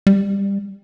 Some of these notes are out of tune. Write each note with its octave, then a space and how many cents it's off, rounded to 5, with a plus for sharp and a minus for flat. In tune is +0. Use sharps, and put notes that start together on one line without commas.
G3 +20